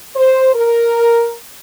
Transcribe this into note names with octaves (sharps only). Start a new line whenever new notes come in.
C5
A#4